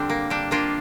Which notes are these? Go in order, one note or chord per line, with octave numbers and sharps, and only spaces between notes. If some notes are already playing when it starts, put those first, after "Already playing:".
Already playing: D3 G3 C4 D4
A#3
G3 D4
A#3 D4 F4